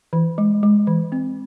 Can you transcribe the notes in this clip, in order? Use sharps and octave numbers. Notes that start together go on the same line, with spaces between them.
E3
G#3
G#3
E3
C4